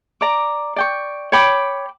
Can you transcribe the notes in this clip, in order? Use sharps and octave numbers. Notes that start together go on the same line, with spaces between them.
D5 A#5 D6
D5 G5 C#6
C#5 G5 B5 D6